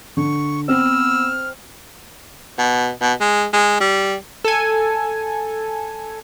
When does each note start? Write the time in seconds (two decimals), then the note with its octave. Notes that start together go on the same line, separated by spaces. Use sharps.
0.17 D3 C#6
0.68 B3 C4 E6 F6
2.58 B2
3.02 B2
3.20 G#3
3.53 G#3
3.80 G3
4.45 A4 G#5